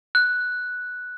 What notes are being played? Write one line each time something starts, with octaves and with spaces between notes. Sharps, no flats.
F#6